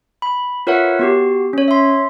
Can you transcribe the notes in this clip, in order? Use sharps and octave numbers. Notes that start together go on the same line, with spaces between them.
B5
F4 A#4 B4 C#5 E5 F#5
B3 F#4 G4
C#4 C#5
E5 C6